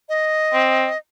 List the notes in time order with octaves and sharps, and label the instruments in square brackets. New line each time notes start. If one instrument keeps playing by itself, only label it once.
[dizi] D#5
[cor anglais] C4